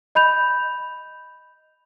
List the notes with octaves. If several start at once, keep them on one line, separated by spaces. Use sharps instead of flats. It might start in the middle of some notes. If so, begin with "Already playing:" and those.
D#5 B5 G6 F7